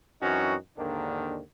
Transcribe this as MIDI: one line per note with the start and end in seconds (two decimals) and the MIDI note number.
0.22 0.56 42
0.22 0.56 52
0.22 0.56 60
0.22 0.56 61
0.22 0.56 63
0.22 0.56 66
0.78 1.41 39
0.78 1.41 44
0.78 1.41 50
0.78 1.41 51
0.78 1.41 58
0.78 1.41 62